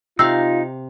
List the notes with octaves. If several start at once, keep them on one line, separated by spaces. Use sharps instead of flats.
C3 D#4 F4 F5 E6